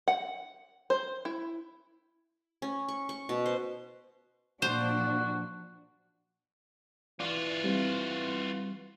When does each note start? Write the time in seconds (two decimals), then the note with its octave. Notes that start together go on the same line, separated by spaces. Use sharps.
0.08 F#5
0.90 C5
1.25 E4
2.62 C#4
2.88 C#6
3.09 C#6
3.29 B2
3.46 C5
4.62 A#2 F3 D4 F#4 C5
7.20 E3 F4 F#4 D5
7.64 G3 C4